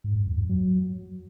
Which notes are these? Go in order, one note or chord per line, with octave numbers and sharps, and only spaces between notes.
G#2
G2
E2
F#2
F#3